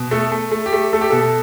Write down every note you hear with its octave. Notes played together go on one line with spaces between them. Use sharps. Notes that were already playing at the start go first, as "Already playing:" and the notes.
Already playing: B2
A3 A4
A3
A3
G4
A3
A3 A4
G4
B2 A4